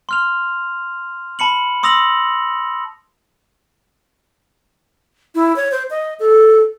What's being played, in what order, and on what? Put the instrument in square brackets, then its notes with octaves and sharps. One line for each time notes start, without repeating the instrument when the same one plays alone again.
[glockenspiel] C6 F6 F7
A5 B5 C#7 F#7
C6 D#6 E6 A#6 F7 F#7
[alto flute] E4
C#5
C5
D#5
A4